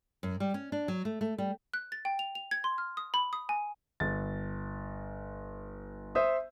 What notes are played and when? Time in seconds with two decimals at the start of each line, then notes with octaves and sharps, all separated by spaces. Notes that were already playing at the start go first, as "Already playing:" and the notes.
0.23 F#2
0.40 G3
0.54 C#4
0.72 D4
0.88 F#3
1.05 A3
1.21 A3
1.38 G3
1.74 F#6
1.92 A6
2.05 G5
2.19 F7
2.35 F7
2.51 G#6
2.64 C6
2.78 F6
2.97 D#6
3.14 B5
3.33 D#6
3.49 G#5
4.00 G1 A6
6.15 C5 E5 D#6